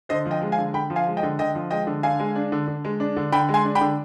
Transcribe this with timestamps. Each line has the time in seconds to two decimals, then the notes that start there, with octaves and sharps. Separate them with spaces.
0.09 D3 C5 D#5
0.25 F3
0.31 D#5 G5
0.42 G#3
0.52 F5 G#5
0.58 D3
0.74 D3 G5 B5
0.90 F3
0.96 F5 G#5
1.07 G#3
1.17 D#5 G5
1.23 D3
1.39 D3 D#5 G5
1.55 F3
1.71 G#3 D#5 G5
1.87 D3
2.03 D3 F5 G#5
2.19 G#3
2.35 D4
2.52 D3
2.67 D3
2.85 G#3
3.00 D4
3.16 D3
3.32 D3 G5 B5
3.49 G#3
3.54 G#5 C6
3.65 D4
3.75 G5 B5
3.81 D3